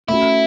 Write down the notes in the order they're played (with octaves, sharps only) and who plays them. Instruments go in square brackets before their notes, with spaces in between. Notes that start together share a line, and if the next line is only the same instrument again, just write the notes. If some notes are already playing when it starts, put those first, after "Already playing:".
[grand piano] A3 C#4 F#4 [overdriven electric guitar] E4